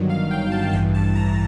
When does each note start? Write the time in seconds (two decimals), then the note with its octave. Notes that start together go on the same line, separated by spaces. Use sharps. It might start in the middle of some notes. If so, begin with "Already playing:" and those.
Already playing: G1 G2 D#3 F#3
0.10 F5
0.31 G5
0.52 A5
0.73 A1 G2 E3 G5
0.94 A5
1.15 A#5